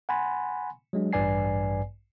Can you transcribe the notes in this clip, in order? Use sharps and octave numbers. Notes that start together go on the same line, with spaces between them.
F#5 G#5 B5 C6
F#3 G#3 D4
A1 G2 B4 D5 G#5 C7